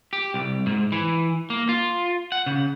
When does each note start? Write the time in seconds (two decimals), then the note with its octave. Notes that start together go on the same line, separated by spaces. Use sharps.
0.13 G4
0.34 C2
0.66 G#2
0.92 E3
1.50 A#3
1.69 F4
2.32 F#5
2.46 C#3